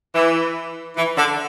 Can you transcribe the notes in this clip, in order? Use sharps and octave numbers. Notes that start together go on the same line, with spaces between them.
E3
E3
D3